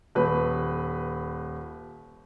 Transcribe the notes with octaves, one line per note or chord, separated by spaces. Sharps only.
D#1 B4